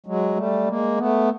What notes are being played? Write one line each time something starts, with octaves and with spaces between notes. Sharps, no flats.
F#3 G#3
G3 A3
G#3 A#3
A3 B3